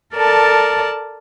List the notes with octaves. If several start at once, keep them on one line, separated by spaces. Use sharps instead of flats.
A4 A#4 D5 A5